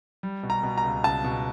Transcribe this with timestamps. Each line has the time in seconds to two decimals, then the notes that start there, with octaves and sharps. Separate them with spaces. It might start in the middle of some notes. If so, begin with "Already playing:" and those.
0.23 G3
0.43 B2
0.50 A#5
0.63 B2
0.77 A#5
0.84 C#2
1.04 C#2 A5
1.24 B2